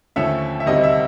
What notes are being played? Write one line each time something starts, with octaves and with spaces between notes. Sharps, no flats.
D#2 D3 F3 A3 C#4 E5
E5
D2 C3 D#3 G3 C4 D#5
E5